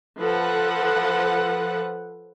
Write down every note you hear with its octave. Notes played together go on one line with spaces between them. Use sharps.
F3 A4 B4 F#5